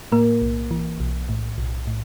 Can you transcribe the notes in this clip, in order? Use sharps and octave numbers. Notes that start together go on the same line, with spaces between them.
A2 A#3 A#4
B1
E3
B1
A2
B1
A2